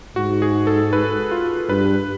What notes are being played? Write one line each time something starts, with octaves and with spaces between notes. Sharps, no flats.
G#2 F#4
G#4
A4
B4
F4
G2 B4